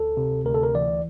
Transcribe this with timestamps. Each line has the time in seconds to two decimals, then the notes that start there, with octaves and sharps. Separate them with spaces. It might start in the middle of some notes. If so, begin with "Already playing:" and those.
Already playing: D2 A4
0.17 C3
0.46 D2 A#4
0.54 A4
0.63 A#4
0.75 E3 D5